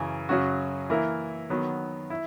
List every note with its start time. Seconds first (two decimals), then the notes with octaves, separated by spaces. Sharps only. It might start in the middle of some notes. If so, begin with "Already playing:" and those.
Already playing: F#2 C#3 E3
0.29 F#2 C#3 F#3 C#4 F#4
0.90 E3 A#3 E4 A#4
1.50 D#3 F#3 B3
2.10 E4